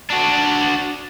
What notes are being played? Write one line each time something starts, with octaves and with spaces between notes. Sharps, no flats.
D4 F#4